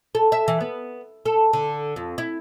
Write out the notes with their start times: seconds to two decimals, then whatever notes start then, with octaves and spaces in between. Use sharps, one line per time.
0.15 A4
0.32 E5
0.48 E3
0.61 B3
1.26 A4
1.53 D3
1.96 F2
2.18 E4